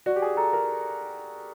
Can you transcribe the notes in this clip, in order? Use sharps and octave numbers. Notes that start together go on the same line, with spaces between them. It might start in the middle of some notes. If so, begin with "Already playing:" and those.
F#4 D5
G4
G#4
A4 A#5
A#4